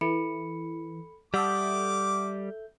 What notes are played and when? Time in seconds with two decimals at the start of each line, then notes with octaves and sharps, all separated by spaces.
0.01 E3 A4 B5 C#7
1.34 G3 A4 E5 F#5 D6 D#6 G6